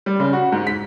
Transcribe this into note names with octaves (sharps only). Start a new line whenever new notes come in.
G3
C#3
F#4
G#2
B6